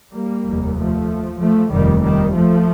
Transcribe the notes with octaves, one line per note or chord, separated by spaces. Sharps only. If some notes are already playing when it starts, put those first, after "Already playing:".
G3 A#3
F1 D#2
F3 A3
F3 A3
F1 D#2 D#3 G3
D#3 G3
F3 A3